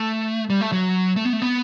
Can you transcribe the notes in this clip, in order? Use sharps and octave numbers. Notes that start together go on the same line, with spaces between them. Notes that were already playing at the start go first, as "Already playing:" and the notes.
Already playing: A3
G3
A3
F#3
A3
B3
A3
B3